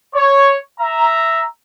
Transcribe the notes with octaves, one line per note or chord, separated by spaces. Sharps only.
C#5
E5 A#5